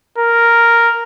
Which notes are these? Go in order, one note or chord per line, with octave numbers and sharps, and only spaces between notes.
A#4